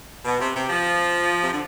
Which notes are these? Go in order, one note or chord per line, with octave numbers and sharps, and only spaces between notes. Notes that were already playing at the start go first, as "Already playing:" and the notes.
B2
C3
C3
F3
C3
D3